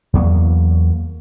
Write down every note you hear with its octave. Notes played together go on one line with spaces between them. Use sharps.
E2 F#3 A#3